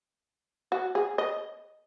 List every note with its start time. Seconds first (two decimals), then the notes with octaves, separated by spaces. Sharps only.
0.72 F#4
0.95 G#4
1.18 D#5